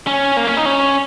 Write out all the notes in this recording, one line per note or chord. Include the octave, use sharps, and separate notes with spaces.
C#4
A#3
C#4
D#4
C#4